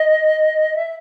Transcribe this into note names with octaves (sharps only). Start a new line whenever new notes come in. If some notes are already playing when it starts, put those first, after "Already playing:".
Already playing: D#5
E5